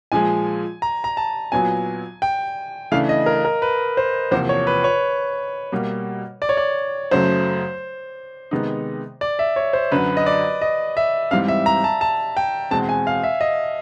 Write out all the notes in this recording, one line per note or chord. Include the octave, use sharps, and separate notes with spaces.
A#2 F3 G#3 G#5
A#5
A#5
A5
A#2 F#3 B3 G#5
G5
C#3 E3 A3 D4 F5
D#5
A#4
A#4
B4
C5
E2 C3 F3 A#3 C5
C#5
B4
C#5
B2 G3 A#3
D5
C#5
D5
F#2 C#3 F#3 A3 C5
C3 D#3 G#3 B3 D#4
D5
E5
C#5
C5
F#2 D3 F#3 B4
D#5
D5
D#5
E5
G#2 E3 G3 C4 F5
E5
A#5
A5
A5
G5
E2 B2 G#3 C4 A5
G#5
F5
E5
D#5